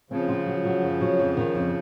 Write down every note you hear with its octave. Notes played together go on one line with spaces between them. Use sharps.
C#3 F3 C4
F4
F#3
F#3
F#2
F#3
F2
D#3
F2